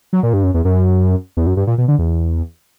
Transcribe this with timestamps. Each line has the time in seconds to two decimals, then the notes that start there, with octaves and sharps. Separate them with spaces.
0.13 F#3
0.23 A#2
0.33 G2
0.44 F#2
0.54 E2
0.65 F#2
1.37 E2
1.47 F#2
1.57 G2
1.67 A#2
1.78 B2
1.88 D3
1.99 E2